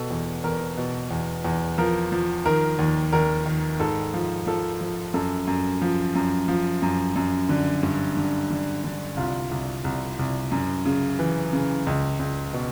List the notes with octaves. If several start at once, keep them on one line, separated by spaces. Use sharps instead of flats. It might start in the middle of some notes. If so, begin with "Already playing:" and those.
Already playing: B2 A4
E2
E2 A#4
B2
E2
E2
F3 A#4
F3
D#3 A#4
D#2
D#2 A#4
D#3
G#2 A4
F3
F3 A4
F3
F#2 A4
F#2
F3
F#2
F3
F#2
F#2
D3
G2
D3
D3
D3
C2 F4
C2
C2
C2
F#2
C#3
E3
C#3
C#2
C#2
B2